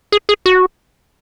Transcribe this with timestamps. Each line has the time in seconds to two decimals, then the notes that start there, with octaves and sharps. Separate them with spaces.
0.12 G#4
0.29 G#4
0.46 F#4